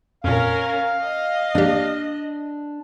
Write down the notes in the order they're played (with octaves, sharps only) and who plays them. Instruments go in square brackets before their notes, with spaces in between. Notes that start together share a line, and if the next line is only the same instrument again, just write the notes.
[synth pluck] F2 A#2 [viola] C#4 A#4 [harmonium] F5
[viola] D#5
[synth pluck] A#3 G4 [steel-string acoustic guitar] D4